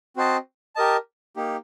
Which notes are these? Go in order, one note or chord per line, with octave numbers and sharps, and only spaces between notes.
C4 F#4 C5 D#5 A5
G4 A#4 D#5 A5
A#3 D#4 G4